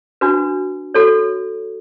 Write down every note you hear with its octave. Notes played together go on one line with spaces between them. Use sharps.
D4 F#4 B4
F#4 A4 C#5